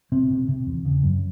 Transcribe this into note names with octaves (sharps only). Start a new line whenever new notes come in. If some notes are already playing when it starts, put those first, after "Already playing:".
C3 C4
C3
C3
E2
C#3
F#2